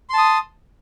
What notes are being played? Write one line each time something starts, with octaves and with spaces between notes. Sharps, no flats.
A5 C6 D#6